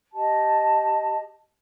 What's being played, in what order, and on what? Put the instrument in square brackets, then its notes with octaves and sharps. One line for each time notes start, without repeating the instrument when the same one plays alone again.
[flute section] G4 D#5 A5